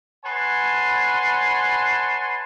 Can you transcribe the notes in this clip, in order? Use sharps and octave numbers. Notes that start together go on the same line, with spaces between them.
B4 C#5 F#5 G#5 A5 C6